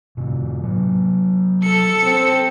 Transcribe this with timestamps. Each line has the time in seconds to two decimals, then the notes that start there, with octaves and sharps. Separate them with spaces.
0.17 A2 C3
0.64 C3 F#3
1.63 A4 C#7
2.03 C4